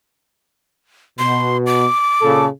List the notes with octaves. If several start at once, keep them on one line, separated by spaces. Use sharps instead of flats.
B2 C6
D6
A#2 C#3 A4